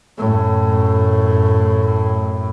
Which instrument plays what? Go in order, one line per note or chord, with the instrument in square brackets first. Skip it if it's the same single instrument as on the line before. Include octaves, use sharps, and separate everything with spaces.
[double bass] F#2 A2